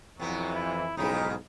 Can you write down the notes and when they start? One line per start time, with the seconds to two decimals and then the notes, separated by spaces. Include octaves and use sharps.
0.20 F2 C3 E3 F#3 B3
0.55 E4
0.97 B1 F2 G#2 C#3 D#4 E4